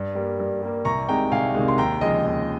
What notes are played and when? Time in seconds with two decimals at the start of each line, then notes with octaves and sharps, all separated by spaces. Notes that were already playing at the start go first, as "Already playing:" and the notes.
Already playing: G2
0.15 G3 A#3
0.40 G2
0.62 G3 A#3
0.85 C2 A#5 C#6
1.08 C3 D#3 G#3 G5 A#5
1.32 C2 F5 G#5
1.55 C3 D#3 G#3
1.68 C6
1.78 D#2 G5 A#5
2.01 C#3 F3 G#3 D#5
2.25 D#2